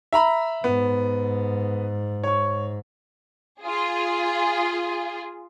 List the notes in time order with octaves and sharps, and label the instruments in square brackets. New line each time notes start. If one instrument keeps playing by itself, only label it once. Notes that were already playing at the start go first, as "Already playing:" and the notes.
[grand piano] E5 A#5 B5
[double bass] G#2 [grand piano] B3
[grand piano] C#5 C#6
[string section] F4 G#4